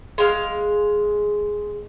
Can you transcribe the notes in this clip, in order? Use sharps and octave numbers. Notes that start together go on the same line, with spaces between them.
G#3 F5